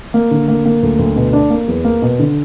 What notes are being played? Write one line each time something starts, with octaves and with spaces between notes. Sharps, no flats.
A#3
D3
A#3
A#3
D2
D2
B2
D4
A#3
E2
A#3
B2
D3